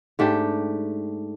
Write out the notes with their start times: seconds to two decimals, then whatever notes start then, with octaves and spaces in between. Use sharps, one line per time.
0.19 G#2 A3 D4 G4